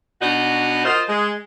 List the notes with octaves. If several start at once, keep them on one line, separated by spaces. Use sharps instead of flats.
B2 D4 D#4 F#4
F4 A#4 C5 D#5
G#3